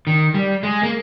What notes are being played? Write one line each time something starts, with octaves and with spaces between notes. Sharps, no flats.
D#3
G3
G#3
A#3